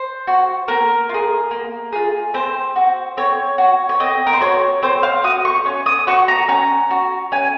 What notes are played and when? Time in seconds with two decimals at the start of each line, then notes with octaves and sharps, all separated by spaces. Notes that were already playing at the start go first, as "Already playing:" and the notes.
Already playing: C5
0.27 F#4
0.68 A#3 A#4
1.09 F4
1.14 G#4
1.51 A#3
1.93 F4 G#4
2.34 C4 C5
2.76 F#4
3.17 C4 C#5
3.58 F#4
3.89 C#5
4.00 C4 D#5
4.27 A#4
4.33 C5
4.41 F#4 C#5
4.83 C4 C5
5.03 F5
5.24 F#4 D#6
5.45 C#6
5.66 C#4
5.86 D#6
6.07 F#4 C#6
6.28 A#5
6.48 C#4 A#5
6.91 F#4
7.32 C#4 G#5